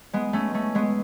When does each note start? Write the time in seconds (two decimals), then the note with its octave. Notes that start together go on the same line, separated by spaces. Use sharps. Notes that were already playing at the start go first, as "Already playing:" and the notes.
0.13 G#3 B3
0.33 A3 C#4
0.54 A3 C#4
0.75 G#3 B3